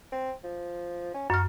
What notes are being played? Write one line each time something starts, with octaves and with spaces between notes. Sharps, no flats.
C4
F3
C#4
F#2 F#4 F6